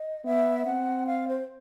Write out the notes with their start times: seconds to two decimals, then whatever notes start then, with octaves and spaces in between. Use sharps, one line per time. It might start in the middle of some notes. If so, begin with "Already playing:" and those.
Already playing: D#5
0.25 B3 E5
0.66 C4 F#5
1.07 F5
1.28 C5